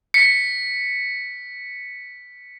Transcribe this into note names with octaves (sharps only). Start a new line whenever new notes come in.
B6 C#7